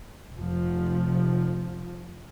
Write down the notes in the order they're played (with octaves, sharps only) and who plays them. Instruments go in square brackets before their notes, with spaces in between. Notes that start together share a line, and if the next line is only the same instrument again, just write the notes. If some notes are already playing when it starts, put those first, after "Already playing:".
[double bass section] F1 F3